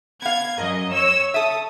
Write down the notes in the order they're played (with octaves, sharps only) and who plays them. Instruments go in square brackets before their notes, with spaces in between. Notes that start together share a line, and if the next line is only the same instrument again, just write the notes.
[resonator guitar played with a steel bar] B3 F5 [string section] G#6
[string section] F#2 D#5 [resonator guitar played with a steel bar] A#4
[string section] C#5 E6
[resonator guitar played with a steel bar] A4 E5 [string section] D#6